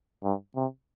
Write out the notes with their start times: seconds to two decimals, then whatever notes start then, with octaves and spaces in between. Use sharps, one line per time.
0.23 G2
0.56 C3